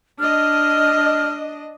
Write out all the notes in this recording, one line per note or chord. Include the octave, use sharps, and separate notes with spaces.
D4 D#5 F6